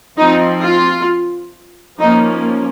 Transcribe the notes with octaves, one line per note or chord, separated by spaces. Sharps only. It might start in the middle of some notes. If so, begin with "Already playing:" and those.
F3 C4 D#4
F4
F3 A#3 C#4 D#4